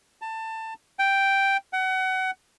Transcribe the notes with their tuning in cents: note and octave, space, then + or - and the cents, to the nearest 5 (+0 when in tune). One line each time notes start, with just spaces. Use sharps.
A5 +20
G5 +0
F#5 +25